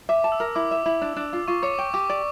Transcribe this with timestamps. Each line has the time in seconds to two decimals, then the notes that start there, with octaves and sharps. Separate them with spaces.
0.09 E5 D6
0.24 A5
0.32 E6
0.40 A#4
0.55 E4 D6
0.71 E5
0.86 E4
1.02 D4
1.16 D4
1.33 F4
1.48 F4 C#6
1.63 C#5 D6
1.78 G5 C#6
1.94 G4 D6
2.09 D5